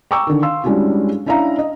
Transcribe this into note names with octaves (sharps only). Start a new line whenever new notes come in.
G5 A#5 C#6 D6 E6
D3 D#3
F5 C6 E6
G3 G#3 C#4 D4 E4 F#4
C#4 D4 E4 E5 F5 A#5
D#5